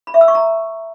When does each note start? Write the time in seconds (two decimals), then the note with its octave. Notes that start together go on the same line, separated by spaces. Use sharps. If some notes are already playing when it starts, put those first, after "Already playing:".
0.07 B5
0.14 E5
0.21 E6
0.28 C#6
0.35 A#5